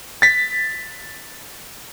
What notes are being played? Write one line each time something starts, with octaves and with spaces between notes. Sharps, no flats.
A6 B6